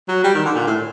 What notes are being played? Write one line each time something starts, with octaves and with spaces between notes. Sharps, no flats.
F#3
G3
D#3
D3
A#2
A2